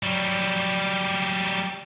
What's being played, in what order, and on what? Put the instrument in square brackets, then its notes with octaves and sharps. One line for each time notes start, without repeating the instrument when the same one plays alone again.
[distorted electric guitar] F#3 G3